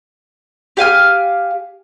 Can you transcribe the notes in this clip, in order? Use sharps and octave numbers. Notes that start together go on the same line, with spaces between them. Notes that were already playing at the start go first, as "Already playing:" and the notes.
G4 F5 G#5 F6